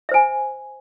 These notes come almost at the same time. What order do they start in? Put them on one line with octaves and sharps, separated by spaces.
E5 C5 G#5